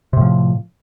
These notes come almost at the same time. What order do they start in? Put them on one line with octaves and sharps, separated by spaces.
C3 A2 F3